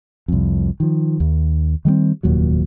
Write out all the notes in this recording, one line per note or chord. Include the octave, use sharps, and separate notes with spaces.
C2 F2
D#3 F3
D#2
D#3 G3 G#3 C4
F1 D#2 A#2 F#3